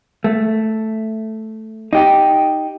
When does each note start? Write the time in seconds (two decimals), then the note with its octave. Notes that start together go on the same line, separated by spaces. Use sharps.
0.24 A3
1.93 D#4 G4